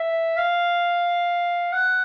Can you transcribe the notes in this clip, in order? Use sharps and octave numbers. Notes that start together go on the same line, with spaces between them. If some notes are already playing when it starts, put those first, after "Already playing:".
Already playing: E5
F5
F#5